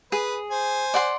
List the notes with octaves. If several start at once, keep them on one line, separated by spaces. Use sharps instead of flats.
G#4 B4
C5 G#5
D5 F#5 C6